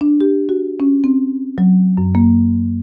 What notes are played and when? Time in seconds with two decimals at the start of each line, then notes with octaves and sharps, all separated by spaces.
0.01 D4
0.21 G4
0.49 F#4
0.80 C#4
1.04 C4
1.58 F#3
1.97 F#2
2.15 A#3